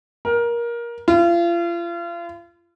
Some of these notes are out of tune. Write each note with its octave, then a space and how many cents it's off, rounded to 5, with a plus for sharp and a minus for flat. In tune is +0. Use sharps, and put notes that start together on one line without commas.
A#4 +20
F4 -35